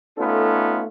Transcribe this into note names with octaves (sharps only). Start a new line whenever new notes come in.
A3 B3 C#4 D#4 F4 A4